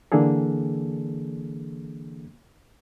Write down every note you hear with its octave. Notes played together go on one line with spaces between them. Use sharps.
D3 E3 A#3 D4 G#4 A4